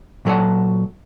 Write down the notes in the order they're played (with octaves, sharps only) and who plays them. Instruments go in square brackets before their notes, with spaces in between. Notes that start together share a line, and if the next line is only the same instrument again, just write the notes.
[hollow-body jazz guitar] A#2 F#3 G#4 A4 D5 F#5